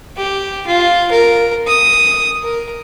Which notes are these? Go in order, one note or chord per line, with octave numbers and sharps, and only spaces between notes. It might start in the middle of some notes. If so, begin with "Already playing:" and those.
G4
F4
A#4
D#6
A#4